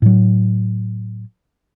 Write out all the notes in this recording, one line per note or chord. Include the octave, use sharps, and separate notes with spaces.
A2 F#3